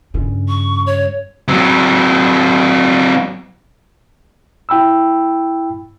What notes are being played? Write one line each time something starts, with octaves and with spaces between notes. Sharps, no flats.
G2 C#3
C#6
C#5
F#3 C4
E4 G5 B5 E6